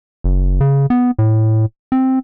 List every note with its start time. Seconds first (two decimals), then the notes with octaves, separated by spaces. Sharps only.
0.24 F#1
0.61 C#3
0.90 B3
1.19 A2
1.92 C4